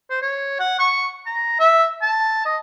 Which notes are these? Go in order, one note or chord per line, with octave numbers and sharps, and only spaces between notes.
C5
C#5
F#5
C#6
A#5
E5
A5
D#5